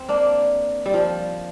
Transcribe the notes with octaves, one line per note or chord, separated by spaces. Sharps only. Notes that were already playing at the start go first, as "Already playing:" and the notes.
Already playing: C4
A#3 D4
G3
F3